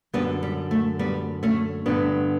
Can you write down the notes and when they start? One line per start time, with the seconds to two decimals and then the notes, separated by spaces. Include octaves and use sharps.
0.13 F#2 D3 G3 B3
0.43 G3
0.71 A3
0.99 G3 B3
1.43 A3 C#4
1.86 G2 D3 B3 D4